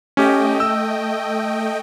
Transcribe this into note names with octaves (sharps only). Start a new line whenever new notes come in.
A3 C#4 G4 D#5 G5
E6